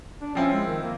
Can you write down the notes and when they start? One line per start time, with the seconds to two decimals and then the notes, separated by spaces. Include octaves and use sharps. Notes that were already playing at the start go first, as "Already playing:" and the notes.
0.21 D4
0.35 F3 C4 C#4 E4
0.52 G#3
0.66 D#3
0.83 A#3